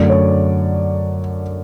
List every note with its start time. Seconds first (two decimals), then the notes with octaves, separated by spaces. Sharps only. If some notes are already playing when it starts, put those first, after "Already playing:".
Already playing: F#2 D3 A3 D5
0.09 C#5